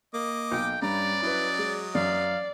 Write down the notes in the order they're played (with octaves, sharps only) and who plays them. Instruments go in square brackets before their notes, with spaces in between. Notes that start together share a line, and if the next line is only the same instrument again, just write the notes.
[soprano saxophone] A#3 [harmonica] D#5 D6
[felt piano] B1 [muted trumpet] G5
[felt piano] G2 [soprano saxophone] C#4 [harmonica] B4 A#5 [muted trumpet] D5
[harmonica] F#3 D#5 [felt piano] E4 B4
[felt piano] G#3
[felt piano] F#2 [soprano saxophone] D5 [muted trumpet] F5